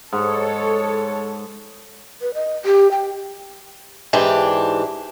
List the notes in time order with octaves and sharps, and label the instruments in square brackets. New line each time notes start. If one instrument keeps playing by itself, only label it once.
[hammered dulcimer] G#2 [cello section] A4 C#5
[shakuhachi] B4
D#5
G4
G5
[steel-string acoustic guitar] G#2 E3 D4 G4